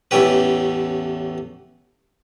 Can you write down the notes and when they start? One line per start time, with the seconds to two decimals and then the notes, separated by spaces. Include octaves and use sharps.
0.11 A1 E2 A3 C#4 G4 B4